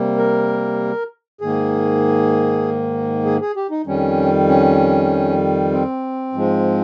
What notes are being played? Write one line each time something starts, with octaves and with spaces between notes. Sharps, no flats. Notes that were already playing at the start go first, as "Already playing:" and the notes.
Already playing: C3 G3 A#3
A#4
G#2 D#3 A#3 G#4
G#4
G#4
G4
D#4
F2 D#3 G3 C#4
C#4
C4
G#2 F3 G#3